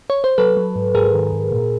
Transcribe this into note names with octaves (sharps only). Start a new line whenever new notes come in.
C#5
C5
F#3 A4 B4
F#3
G#2
G#2 G#4 A#4
D#3
G#2
A#2